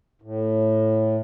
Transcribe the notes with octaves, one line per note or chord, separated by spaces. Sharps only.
A2